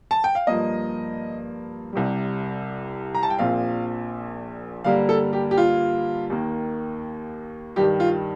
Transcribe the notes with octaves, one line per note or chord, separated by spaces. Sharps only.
A5
G5
F5
G2 F3 A#3 D#5
C2 C3 G3
A#5
A5
G5
A#1 A#2 F3 C4 F5
G2 D3 G3 A#3 F5
A4
G4
G4
F4
D#2 D#3 A#3
G2 D#3 G3 G4
F4